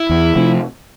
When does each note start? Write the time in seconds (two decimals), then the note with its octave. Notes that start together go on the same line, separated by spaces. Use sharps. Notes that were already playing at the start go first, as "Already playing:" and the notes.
Already playing: E4
0.09 E2
0.36 C3 F3 A3